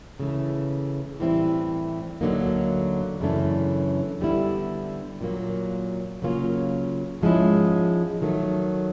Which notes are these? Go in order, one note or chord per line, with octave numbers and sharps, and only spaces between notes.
C#3 E3 A3
A2 E3 G3 C4 E4
D2 D3 F#3 A#3 D#4
F#2 C#3 E3 A3 D4
D3 G3 B3 E4
A#2 F#3 A#3
C#3 F#3 A#3 C#4 F4
G#2 F3 G#3 C#4 E4
D#3 F#3 A3